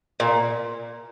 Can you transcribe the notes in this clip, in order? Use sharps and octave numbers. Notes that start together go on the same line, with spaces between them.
A#2